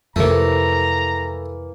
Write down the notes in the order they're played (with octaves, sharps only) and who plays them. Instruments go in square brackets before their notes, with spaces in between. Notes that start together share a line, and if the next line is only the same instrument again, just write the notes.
[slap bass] F2 C3 [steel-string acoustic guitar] E3 A#3 [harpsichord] A3 [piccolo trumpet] A#5